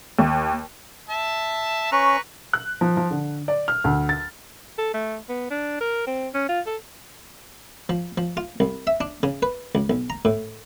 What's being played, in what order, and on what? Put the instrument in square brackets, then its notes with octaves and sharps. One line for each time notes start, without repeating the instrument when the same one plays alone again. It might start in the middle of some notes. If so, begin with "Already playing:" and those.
[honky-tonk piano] D#2
[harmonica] E5 A5
[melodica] C#4 [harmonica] B4 A#5 C#6
[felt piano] F#6
F3
F3
D3
D5
F6
D2
A6
[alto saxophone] A4
A3
B3
D4
A#4
C4
C#4
F4
A4
[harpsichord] F3
F3
F4
C2
E5
D4
C#3
B4
C#2
B1
A#5
A2